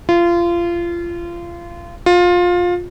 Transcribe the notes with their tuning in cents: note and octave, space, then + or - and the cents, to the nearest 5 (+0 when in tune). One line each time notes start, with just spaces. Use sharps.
F4 -25
F4 +20